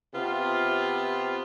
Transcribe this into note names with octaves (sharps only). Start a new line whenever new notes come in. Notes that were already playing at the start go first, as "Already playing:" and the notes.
C3 B3 F4